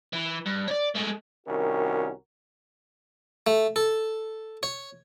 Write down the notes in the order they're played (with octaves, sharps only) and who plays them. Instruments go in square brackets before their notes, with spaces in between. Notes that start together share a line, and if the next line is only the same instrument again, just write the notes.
[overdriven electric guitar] E3
G2
C#5 D5
G#3 A3
[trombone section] C2 D#3 C#4 [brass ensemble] F#4 A#4
[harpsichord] A3
A4
C#5